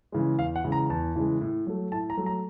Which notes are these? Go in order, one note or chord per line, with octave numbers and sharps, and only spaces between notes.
C#3 E3 G#3
E2 F5
F#5
C#3 E3 G#3
A#5
E2 A5
C#3 E3 G#3
A2
F#3 A3
A2 A5
A#5
F#3 A3
A#5